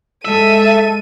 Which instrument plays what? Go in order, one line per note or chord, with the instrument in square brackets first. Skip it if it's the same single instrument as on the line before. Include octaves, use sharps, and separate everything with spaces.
[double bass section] G#3 [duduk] A4 [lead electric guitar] E5 [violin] D#7